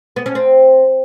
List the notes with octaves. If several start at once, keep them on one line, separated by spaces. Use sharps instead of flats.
B3
C#4
C4